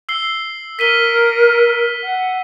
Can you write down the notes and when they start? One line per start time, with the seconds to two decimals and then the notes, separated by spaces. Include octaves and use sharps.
0.09 E6 C7 G7
0.79 A#4 B6 D#7 G7
2.03 F#5